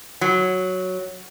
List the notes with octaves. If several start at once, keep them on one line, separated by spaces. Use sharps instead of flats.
F#3